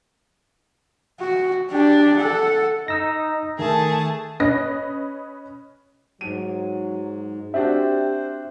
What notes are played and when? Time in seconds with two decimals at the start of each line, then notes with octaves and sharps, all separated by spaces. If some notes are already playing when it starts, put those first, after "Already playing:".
1.20 F#4
1.71 D4 G4
2.17 A4 F#5
2.88 D#4 E6 A#6
3.59 D#3 A3 G#4 A5
4.40 C#4 B4 D#5 A#6
6.21 G#2 F#3 D#7
7.54 C4 D4 F#4 G4 C5 E5